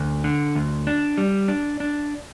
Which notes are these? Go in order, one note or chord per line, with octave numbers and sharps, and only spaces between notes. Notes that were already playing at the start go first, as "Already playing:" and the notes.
Already playing: D2
D3
D2
D4
G3
D4
D4